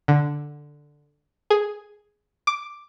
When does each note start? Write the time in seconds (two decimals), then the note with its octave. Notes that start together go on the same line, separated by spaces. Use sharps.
0.08 D3
1.50 G#4
2.47 D6